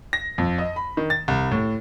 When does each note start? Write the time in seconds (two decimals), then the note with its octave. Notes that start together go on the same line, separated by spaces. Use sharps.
0.13 A#6
0.38 F2
0.58 D#5
0.76 B5
0.97 D#3
1.10 A6
1.28 C2
1.51 A2